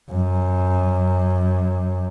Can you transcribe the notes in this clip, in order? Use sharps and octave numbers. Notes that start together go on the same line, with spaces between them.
F#2